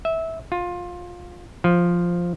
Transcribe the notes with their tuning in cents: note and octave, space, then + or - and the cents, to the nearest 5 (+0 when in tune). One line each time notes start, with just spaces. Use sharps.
E5 -15
F4 +20
F3 +0